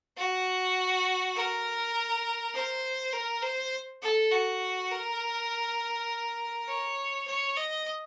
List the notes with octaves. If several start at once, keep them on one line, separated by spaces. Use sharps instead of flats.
F#4
A#4
C5
A#4
C5
A4
F#4
A#4
C#5
C#5
D#5